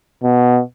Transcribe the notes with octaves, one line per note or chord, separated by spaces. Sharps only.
B2